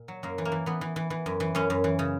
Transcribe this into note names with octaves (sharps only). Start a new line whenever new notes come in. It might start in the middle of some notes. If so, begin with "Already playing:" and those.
Already playing: A#2
F#3
F#2 A#3
E3
A#3
E3
E3 B3
E3
E3
E3
F#2
E3
F#2 C#4
F#2
E3
C#3